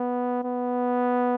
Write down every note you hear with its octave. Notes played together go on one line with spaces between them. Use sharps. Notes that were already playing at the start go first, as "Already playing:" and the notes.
Already playing: B3
B3